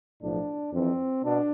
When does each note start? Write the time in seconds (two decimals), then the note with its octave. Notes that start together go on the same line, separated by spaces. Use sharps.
0.22 B1 A2 F3 D4
0.73 F2 E3 C4
1.23 B2 D4